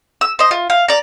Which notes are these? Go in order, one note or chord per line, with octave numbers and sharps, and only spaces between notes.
E6
C5 D#5
F4
F5
D5 A#5